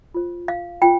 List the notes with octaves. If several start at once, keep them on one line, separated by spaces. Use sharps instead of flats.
F4 C5
F5
F4 C5 G5